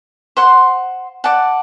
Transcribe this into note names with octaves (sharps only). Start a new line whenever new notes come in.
C5 F#5 C6
D5 F#5 A5